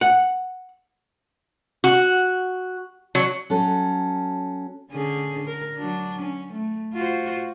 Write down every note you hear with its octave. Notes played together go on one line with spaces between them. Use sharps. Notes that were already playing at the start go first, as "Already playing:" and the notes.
F#5
F#4
F#3
F#3 C#4 A4
D3 C#4 G#4
A#4
F#3 D4
C#4
A3
F4 F#4 C5